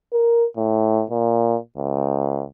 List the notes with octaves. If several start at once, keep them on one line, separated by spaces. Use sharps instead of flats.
A#4
A2
A#2
C#2